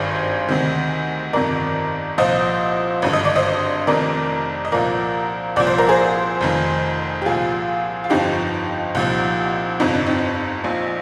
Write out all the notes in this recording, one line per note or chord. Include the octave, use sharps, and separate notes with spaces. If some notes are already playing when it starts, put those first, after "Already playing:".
Already playing: G#1 G2 D#3 G#4 C5
D2 C3 D#3
G1 F2 C3 D#3 A#4 D5
C2 A#2 F3 C5 D#5
G#1 G2 D3
D#5
D5
C5 D#5
F1 F2 C3 D#3 A#4 D5
D#5
C2 A#2 F3 A#4 D5
C2 A#2 F3 D5
C5
A#4
G#4 C5
F1 F2 D#3
G4
C2 A#2 F3 F4 G#4
F4
G1 F2 D3 F3 D#4 G4
C2 A#2 F3
G1 F2 C3 D#4
D4
C4 D#4
A#1 A#2 F3